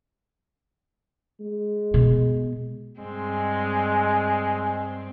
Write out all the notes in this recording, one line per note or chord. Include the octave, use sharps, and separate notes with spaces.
G#3
B2
G2 G#3 C4